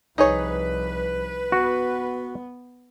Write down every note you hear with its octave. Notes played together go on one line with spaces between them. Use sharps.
C2 F3 D#4 G#4 B4 C#5
B3 F#4